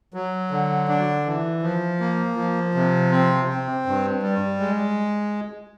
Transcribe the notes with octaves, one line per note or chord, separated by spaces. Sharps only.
F#3
D3
D4
E3
F3
A#3
F3
C3
C4
C4
G2
G3
G#3